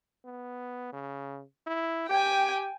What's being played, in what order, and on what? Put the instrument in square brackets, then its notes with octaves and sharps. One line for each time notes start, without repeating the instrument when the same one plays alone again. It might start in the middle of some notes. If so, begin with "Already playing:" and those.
[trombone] B3
C#3
E4
[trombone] G4 [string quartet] G5 G#5